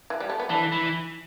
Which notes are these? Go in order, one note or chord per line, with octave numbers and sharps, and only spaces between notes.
E3
G3
A3
B3
E3 A3 D4
E3